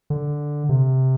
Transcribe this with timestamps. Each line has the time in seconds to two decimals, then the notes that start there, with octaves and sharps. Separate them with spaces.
0.10 D3
0.69 C3